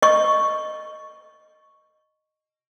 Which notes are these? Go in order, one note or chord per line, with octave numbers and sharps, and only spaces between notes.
D#5 C#6